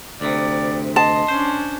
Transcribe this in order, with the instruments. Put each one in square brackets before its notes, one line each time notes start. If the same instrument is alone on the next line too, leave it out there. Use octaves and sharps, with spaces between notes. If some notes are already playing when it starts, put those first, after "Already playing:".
[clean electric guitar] D2 C3 [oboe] D5
[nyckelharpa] D#5 [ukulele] A5 [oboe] C6
[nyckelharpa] C#4 D4 [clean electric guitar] C5